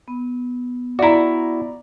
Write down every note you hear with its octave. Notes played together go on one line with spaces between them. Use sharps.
B3
E4 F#4 D5 A#5